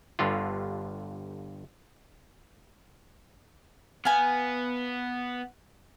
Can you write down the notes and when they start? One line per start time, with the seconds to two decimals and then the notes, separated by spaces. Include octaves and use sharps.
0.19 G1 G2 D3 F4
4.05 B3 F5 G#5